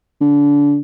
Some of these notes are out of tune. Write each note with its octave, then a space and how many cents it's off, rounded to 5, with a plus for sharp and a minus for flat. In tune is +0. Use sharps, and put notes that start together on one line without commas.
D3 -25